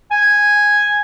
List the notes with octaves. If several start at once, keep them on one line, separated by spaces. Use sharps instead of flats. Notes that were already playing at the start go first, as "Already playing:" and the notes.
G#5